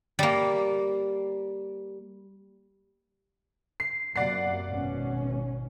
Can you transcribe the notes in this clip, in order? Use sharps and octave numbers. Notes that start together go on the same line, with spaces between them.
G3 A#3
C7
F#2 C3 A#3 D5 F#5 C7
G#1 B2 C#4